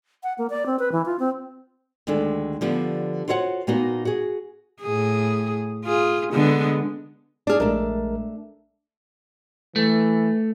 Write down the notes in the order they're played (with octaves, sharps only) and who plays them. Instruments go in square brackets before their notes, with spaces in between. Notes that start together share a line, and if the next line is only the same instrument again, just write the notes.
[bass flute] F#5
A#3
D5
C4
B4
E3
F4
C4
[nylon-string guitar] D2 D#3 G#3 D4 A4
D3 F3 G3 B3
F4 F#4 C5 C#5 D#5 F#5
A#2 A#3 B3 D#4 F#4
F#4 G#4
[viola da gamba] A2 G#4
F4 G#4
D3 G#3 B3
[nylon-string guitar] D4 G#4 [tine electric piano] D5 F6
[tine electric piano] A#1 G#3 A#4 [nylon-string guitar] A3 D4
[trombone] E3 [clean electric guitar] A3